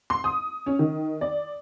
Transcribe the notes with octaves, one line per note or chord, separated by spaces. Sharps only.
C6
D#6
C#4
D#3
D5